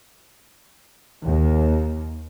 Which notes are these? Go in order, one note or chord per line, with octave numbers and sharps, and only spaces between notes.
D#2